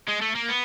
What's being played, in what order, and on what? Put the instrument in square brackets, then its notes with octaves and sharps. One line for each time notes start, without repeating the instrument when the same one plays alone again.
[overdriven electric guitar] G#3
A3
A#3
B3